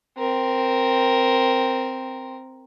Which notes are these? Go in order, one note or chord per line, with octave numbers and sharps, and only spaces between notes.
C4 A#4